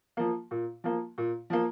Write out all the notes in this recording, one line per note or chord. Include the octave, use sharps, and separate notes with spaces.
F3 A#3
A#2
F3 A#3
A#2
F3 A#3